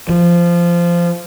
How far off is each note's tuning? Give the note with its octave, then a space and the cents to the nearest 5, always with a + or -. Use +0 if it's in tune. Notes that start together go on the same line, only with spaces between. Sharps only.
F3 -15